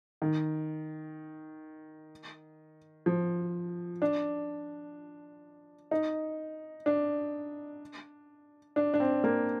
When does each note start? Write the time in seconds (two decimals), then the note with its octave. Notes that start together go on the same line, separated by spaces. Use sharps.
0.22 D#3
3.06 F3
4.02 D4
5.91 D#4
6.86 D4
8.76 D4
8.94 D4
9.00 C4
9.24 A#3